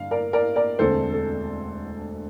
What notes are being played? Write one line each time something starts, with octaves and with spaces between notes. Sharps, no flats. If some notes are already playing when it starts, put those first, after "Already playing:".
Already playing: G2 D3 F5
A#4 D5
A#4 D5
A#4 D5
E1 D2 D3 A3 C4 A4 C5
A4